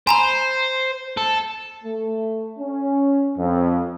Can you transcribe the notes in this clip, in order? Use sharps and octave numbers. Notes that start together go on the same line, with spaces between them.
C5 G#5 A#5 B5
A4
A3
C#4
F2